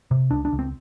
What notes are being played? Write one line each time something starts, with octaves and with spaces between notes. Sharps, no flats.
C3
C#2 D4
D4
C#2
C4